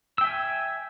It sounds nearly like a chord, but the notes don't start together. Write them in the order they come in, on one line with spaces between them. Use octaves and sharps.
E6 G5 E5 G#5